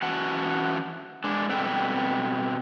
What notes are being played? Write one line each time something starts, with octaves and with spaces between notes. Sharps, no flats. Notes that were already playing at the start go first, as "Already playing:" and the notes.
E3 C#4 F#4 F#5 A5
G#3 D4
B2 G3 C4 A4 B4 G5